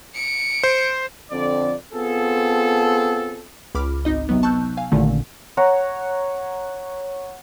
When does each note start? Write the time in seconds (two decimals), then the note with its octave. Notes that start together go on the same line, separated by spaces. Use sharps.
0.15 C#7 D7
0.63 C5
1.31 F2 D3 C4 D5
1.94 B3 C4 F4 G#4 A4
3.75 C#2 B5 D6 F6
4.05 G#1 D#4 D#5
4.29 C3 F#3 B3
4.43 A5 C#6 E6 F#6 G6
4.77 F5 G#5
4.92 A1 A#2 D3 D#3 A3
5.57 C#5 F#5 A#5